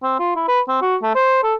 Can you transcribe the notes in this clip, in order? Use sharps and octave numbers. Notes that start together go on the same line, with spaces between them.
C4
F4
E4
B4
C4
F#4
A3
C5
A4